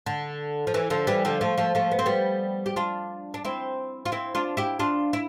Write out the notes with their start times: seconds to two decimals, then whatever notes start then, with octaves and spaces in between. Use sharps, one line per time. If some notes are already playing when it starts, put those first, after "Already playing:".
0.06 D3
0.67 F3
0.74 E3
0.90 D3 F3
1.07 E3 G3
1.25 D3 F3
1.41 F3 A3
1.58 F3 A3
1.75 F3 A3
1.91 B3
1.99 C4
2.06 G3 B3
2.66 G4
2.76 D4 F4
3.34 D4
3.45 C4 E4
4.05 F4
4.12 C4 E4
4.35 D4 F4
4.57 E4 G4
4.79 D4 F4
5.13 E4